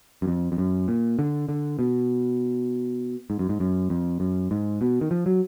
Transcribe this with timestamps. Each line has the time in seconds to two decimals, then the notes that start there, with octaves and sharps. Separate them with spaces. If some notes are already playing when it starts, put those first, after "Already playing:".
0.22 F#2
0.28 F2
0.52 F2
0.58 F#2
0.88 A#2
1.19 D3
1.49 D3
1.79 B2
3.30 G#2
3.39 F#2
3.49 G#2
3.60 F#2
3.90 F2
4.20 F#2
4.51 G#2
4.81 B2
5.01 D#3
5.11 F3
5.26 F#3